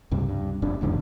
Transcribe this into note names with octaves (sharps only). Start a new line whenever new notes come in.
C#2 G2 C3
G2
F1 A#1 C3 D4
F#1 E2 G#2 D3